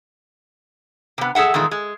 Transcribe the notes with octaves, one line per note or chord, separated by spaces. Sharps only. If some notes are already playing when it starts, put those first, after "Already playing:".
C3 B3
G#4 A4 E5 F#5
E2 A#2 D#3 G#3
G#3